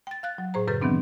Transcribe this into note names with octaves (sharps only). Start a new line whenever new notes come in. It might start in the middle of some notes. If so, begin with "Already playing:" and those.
G5 A6
F5 F#6 A6
F#3
A2 G#4 C5 A#5
F#2 A2 C#3 A4 B4 G6
D#3 E3 F#3 B3 C4 D4